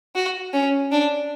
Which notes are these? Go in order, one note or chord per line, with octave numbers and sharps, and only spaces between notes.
F#4
C#4
D4